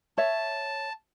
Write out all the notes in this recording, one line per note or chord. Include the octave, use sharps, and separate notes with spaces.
C#5 E5 A5